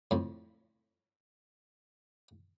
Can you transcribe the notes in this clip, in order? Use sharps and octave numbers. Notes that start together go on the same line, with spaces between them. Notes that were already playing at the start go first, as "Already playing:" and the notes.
F2 A2